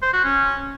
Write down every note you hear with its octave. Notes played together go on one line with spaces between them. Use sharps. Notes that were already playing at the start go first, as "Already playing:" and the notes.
C5
F#4
C#4